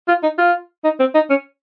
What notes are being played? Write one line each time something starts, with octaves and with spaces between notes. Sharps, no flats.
F4
D#4
F4
D#4
C4
D#4
C#4